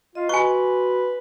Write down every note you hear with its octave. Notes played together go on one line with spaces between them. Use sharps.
F4 D#5
F#4 B4 G#5 C6 C#6